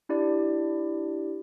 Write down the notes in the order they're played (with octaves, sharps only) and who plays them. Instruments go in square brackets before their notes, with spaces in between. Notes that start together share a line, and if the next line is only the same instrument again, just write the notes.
[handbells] D4 E4 G4 D5